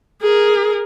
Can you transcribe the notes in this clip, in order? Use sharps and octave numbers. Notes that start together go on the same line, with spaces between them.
G#4 A#4